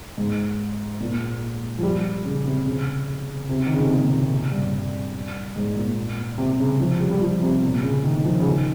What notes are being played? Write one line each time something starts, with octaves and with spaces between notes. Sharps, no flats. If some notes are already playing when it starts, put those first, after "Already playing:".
G#2
A#2
F3
G3
C#3
C3
C#3
C3
D#3
C#3
C3
A#2
G2
G#2
A#2
C3
C#3
F3
G3
G3
F3
C3
A#2
C#3
D#3
F3
C#3
D#3